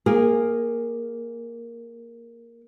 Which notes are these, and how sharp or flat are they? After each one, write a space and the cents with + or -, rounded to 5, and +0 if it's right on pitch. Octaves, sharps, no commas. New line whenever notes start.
A#3 +0 G#4 -15